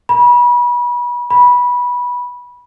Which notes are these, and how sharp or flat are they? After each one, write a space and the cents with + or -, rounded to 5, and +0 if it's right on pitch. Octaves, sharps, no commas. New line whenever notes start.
B5 -30
B5 -15